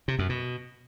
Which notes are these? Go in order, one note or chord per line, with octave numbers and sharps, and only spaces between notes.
C3
F#2
B2